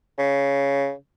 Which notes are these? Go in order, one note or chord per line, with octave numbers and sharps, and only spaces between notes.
C#3